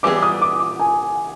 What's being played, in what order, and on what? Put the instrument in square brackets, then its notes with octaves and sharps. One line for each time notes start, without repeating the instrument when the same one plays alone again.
[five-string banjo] E3 G3 B3 E4 G#4 [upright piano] D6
[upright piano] D#6
D6
D6
G#5